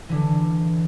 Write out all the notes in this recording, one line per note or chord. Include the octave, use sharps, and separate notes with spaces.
D3 E3